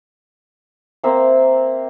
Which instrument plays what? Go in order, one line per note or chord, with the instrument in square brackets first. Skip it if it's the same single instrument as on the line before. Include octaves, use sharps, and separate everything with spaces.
[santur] A#3 C4 C5 E5